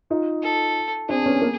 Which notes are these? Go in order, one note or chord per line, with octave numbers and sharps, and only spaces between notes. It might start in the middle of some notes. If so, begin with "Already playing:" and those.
D#4 F4
A4
C4 D4 G#4
B3 C#4
A#3